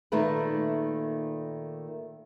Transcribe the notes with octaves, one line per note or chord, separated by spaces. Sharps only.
A#2 D#3 A3 A#3 B4